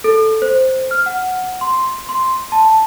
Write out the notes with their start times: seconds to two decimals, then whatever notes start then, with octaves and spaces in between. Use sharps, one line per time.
0.04 A4
0.42 C5
0.91 F6
1.06 F#5
1.61 C6
2.09 C6
2.52 A5